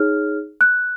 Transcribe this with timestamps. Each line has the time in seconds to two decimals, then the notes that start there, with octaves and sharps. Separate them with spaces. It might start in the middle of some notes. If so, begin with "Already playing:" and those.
Already playing: D#4 G#4 C#5 F6
0.61 F#6